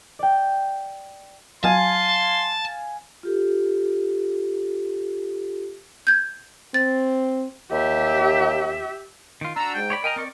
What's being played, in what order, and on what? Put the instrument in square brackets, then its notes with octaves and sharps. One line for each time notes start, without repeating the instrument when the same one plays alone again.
[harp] D5 G5
[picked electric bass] F#3 [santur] F5 G#5 [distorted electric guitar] A5 [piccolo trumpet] C6
[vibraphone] F4 G4 A4
[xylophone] G6 G#6
[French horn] C4 [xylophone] A6
[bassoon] D#2 [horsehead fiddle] G4 E5
[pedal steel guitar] D#3 F4
[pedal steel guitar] D4 F#4 [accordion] A#5 E6
[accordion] G#2 G5
[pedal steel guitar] C#5 D5 B5
[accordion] A#4 D#5 [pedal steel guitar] G5 G#5 A#5
[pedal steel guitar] C4 D5 C#6